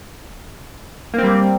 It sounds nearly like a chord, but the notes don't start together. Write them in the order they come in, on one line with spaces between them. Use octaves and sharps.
A#3 C4 G3